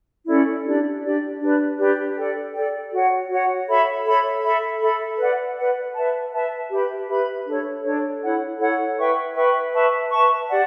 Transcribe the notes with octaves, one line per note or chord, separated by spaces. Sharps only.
C#4 E4 A4 D5
D4 G4 D5
D4 G4 D5
D4 G4 B4 D5
D4 G4 B4 D5
A4 D5 G5
A4 D5 G5
F#4 C#5 F#5
F#4 C#5 F#5
A4 C#5 E5 B5
A4 C#5 E5 B5
A4 E5 B5
A4 E5 B5
B4 D5 F#5
B4 D5 F#5
B4 E5 A5
B4 E5 A5
G4 B4 E5 B5
G4 B4 E5 B5
D4 A4 C#5
D4 A4 C#5
E4 A4 C#5 F#5
E4 A4 C#5 F#5
B4 E5 G5 C#6
B4 E5 G5 C#6
B4 E5 A5 C#6
B4 E5 A5 C#6
G4 D5 F#5